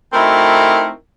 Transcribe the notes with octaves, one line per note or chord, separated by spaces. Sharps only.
A3 C4 D#4 E4 F#4 A#4